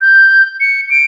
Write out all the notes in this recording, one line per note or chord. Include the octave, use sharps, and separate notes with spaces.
G6
C#7
D7